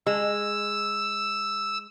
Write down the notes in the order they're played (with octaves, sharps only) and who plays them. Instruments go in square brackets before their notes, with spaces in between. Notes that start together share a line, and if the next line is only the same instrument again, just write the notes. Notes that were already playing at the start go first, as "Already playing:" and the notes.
[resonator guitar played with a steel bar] G#3 [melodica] E6